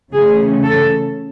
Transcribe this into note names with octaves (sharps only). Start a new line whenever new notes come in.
C#3 E3 A3 C#4 G#4
A4